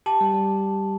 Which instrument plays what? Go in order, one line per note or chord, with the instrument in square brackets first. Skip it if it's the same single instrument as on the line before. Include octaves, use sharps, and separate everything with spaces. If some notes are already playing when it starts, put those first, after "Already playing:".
[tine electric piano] G4 [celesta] A5
[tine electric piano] G3
G3